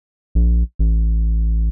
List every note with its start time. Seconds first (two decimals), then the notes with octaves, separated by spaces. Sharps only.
0.35 A#1
0.79 A1